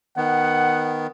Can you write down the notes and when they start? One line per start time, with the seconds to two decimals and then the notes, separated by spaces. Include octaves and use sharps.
0.17 D#3 B3 F#5